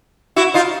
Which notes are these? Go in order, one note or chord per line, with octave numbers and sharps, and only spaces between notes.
E4 F#4
D#4 F4